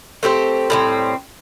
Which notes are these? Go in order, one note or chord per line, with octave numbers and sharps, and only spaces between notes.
A3 C4 G4 C5
A2 G3 C4